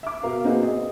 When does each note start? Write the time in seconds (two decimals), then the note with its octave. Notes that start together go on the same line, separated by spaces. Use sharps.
0.03 E5 D6
0.23 B2 A#4 F5
0.44 A#3 C4 D#4 F#4 G#4 B4
0.63 D#5